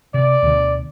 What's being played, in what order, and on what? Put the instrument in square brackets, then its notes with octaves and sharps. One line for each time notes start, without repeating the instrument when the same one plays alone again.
[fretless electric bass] C3 [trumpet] D5
[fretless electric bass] D2 B2 D3